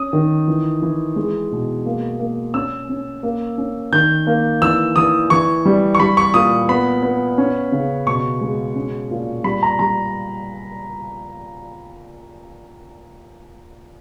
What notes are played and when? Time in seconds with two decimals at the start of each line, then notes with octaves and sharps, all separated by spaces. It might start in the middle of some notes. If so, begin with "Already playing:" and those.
Already playing: C#4 D#6
0.13 D#3
0.48 E3
0.82 E3
1.16 G#3
1.52 B2
1.86 A#3
2.19 A#3
2.54 C#4 E6
2.89 C#4
3.23 A#3
3.58 C#4
3.93 D#3 G6
4.27 A#3
4.62 E3 E6
4.96 E3 D#6
5.30 E3 C#6
5.66 G3
5.95 C#6
6.00 G3 B5
6.17 C#6
6.34 A#2 D#6
6.69 B3 B5
7.03 B3
7.38 C#4
7.72 C#3
8.07 B2 C#6
8.41 G#3
8.76 C#4
9.11 A#2
9.44 G3 B5
9.63 A#5
9.79 G3 A#5